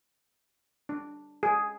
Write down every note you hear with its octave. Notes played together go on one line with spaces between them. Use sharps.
D4
G#4